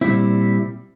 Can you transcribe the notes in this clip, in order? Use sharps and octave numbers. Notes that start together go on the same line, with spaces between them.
A#2 G3 C4 E4